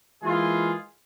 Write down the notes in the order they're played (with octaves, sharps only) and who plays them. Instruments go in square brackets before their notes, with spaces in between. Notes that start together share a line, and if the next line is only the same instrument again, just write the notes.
[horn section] E3 G#3 A#3 F4 G#4